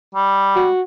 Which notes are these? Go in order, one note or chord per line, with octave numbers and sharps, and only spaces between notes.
G3
F#4